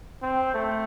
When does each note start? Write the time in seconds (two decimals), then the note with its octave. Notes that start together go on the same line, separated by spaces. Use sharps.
0.22 C4
0.54 A3